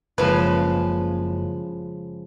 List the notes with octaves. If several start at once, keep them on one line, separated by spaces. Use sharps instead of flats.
F#1 C#3 F3 G#3 B4